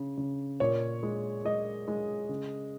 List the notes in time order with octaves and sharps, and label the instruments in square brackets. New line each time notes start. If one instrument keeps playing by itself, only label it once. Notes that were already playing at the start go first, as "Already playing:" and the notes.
Already playing: [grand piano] C#3
C#3
A#2 C#5
G#3
G#3 D#5
G#3
C#3